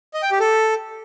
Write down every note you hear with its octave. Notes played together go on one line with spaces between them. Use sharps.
D#5
G5
G4
A4